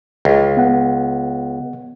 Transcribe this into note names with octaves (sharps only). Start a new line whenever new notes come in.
C#2
B3 F#5